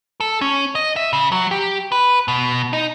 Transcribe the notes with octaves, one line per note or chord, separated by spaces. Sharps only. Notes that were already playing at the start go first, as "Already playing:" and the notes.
A4
C#4
D#5
E5
C#3
F#3
G4
B4
B2
D#4